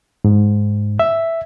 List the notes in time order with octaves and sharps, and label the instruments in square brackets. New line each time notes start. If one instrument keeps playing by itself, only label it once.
[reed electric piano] G#2
E5